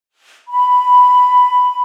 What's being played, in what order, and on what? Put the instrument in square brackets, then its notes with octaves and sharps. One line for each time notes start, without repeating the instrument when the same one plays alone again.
[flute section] B5